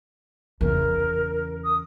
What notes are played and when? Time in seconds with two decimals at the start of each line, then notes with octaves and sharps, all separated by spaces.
0.61 E2 C#3 A#4
1.64 D#6